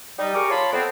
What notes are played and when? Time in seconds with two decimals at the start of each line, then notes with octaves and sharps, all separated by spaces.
0.19 G3 D#4
0.35 G4 G#4 A#4 A#5 C#6 D6
0.50 F4 C#5 D5 A5 B5 C6
0.72 F2 B3 C4